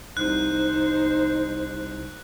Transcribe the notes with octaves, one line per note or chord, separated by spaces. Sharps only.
C2 D#4 C5 F#6